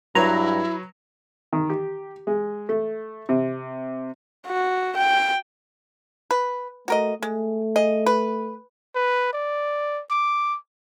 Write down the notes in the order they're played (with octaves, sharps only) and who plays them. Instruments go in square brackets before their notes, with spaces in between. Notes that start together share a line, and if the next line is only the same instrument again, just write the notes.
[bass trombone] G2 [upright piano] F#3 B4 C#5 [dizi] E4 [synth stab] A#5
[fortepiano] D#3
G4
G#3
A3
C3
[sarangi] F#4
G5
[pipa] B4
[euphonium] A3 [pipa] F#4 A#4 D#5
[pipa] G#3 [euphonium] A3
[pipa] G#4 D#5
B4
[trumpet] B4
D5
D6